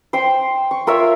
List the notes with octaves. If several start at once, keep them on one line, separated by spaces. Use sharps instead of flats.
C5 G5 C6
C#6
F4 A#4 C#5 E5